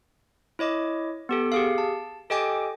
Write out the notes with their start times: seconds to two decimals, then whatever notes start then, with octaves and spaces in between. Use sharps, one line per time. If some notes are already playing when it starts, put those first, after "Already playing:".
0.59 E4 C#5 D#5 D6
1.29 B3 G4 A4
1.52 G4 G#4 F5
1.78 A5
2.30 G4 A4 D#5 G5 G#5 D6